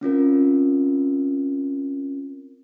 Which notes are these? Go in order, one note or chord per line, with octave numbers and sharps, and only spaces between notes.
C4 C#4 F4 A#4